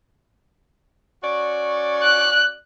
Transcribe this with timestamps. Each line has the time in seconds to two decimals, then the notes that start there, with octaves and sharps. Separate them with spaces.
1.22 C#4 F#4 D5
2.03 F#6